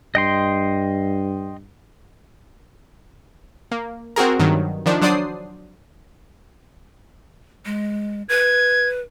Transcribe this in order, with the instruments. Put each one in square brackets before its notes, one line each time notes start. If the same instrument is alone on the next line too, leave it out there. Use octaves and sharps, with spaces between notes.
[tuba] G2 [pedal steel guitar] D#5 G5 C6
[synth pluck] A#3
C4 F#4 G#4 A#4
G2 D#3 F#3
D#3 F3 D4
F#3 D4 C5 D5 D#6 C7
[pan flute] G#3
[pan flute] B4 [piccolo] G#6